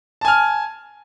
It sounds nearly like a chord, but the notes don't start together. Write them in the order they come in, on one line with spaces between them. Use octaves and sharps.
A5 G#5 F6